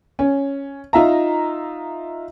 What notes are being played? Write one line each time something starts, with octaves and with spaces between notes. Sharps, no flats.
C#4
D#4 F4 E5 A#5